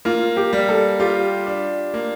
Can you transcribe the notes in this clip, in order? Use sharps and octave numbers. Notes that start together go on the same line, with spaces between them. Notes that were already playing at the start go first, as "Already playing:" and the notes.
A#3 F4
G4
G3
A4
F4 G4
D4
A#3